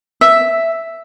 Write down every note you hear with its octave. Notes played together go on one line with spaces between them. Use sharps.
E5